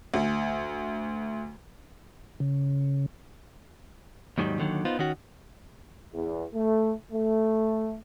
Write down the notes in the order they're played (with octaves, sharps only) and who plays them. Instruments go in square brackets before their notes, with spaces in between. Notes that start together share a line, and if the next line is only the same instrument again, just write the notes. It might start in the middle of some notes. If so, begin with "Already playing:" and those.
[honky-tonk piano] D2
[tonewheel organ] C#3
[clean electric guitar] D#2 G#2 D#3 F#3 G3
D#2 D3 D#3 F#3
B3 D#4 F4 C5
D#3 C#4 F#4
[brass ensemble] E2
A3
A3